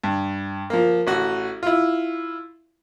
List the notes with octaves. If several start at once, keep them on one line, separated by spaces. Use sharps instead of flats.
G2
F3 A#3
A1 F#4
E4 F4